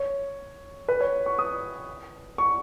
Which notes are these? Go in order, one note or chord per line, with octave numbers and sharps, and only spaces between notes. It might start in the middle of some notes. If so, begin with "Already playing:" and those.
Already playing: C#5
B4
C#5
C#6
D#6
C#6